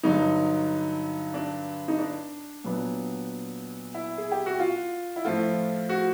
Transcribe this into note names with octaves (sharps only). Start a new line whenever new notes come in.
G2 D3 F#3 D#4
D4
D#4
D4
A#2 F#3 B3 D4
E4
G#4
G4
F#4
F4
E4
A2 F3 A3 F4
F#4